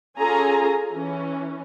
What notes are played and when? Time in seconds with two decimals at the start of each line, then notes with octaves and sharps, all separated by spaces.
0.18 C#4 F4 G#4 A4 G#5 A#5
0.95 E3 C#4